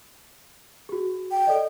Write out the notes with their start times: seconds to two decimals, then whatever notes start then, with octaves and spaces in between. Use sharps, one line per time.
0.89 F#4 G#4
1.31 G5
1.47 A4 D5 D#5